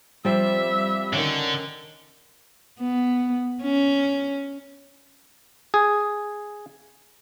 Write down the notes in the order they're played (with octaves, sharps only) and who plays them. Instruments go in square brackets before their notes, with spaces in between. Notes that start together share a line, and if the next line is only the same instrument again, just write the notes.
[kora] F3 C4 [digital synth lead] G3 [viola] E5
[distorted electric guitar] D3 [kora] D#3 C#4
[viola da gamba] B3
C#4
[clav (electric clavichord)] G#4